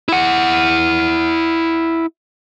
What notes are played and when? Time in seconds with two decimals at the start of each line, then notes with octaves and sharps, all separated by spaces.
0.09 E4 F#5